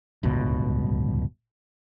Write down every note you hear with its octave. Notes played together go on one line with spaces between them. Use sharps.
D1 G1 C#2 B2